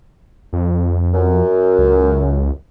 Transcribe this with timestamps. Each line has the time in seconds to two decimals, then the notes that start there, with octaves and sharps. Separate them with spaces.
0.53 F2
1.14 F#2
1.79 C#2